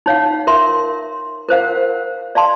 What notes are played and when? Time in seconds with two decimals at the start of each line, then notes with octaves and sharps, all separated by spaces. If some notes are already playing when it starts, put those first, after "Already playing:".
0.06 D#4 C#5 F5 F#5
0.47 A#4 E5 C6
1.49 A#4 C5 F5 F#5
2.35 D5 F5 A5 C6